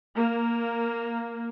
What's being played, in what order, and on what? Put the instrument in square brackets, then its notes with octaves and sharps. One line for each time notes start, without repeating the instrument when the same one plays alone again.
[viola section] A#3